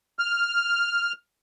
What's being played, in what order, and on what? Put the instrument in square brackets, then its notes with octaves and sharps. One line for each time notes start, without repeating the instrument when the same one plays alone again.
[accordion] F6